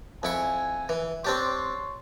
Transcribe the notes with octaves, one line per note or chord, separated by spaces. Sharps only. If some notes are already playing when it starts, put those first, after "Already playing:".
F2 E4 G#5 C#6
E3
C4 D4 G4 C#5 C6